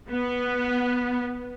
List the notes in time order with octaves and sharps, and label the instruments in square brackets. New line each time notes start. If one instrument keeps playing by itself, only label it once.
[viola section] B3